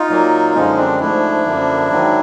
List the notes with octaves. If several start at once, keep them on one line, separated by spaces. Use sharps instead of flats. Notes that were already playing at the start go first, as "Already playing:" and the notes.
Already playing: D#4 F4
A#2 F#3 A#3
F#2 D3 F3 G#3 C#4 D#4
C4 D4
G#2 F3 A3 D4 E4
F#2 D3 F3 A#3
G#2 D#3 F#3